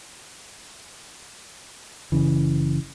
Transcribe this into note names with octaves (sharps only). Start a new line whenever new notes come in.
F#1 C#3 E3